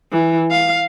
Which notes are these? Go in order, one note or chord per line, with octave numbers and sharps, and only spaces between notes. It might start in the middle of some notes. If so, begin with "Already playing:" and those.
E3
F5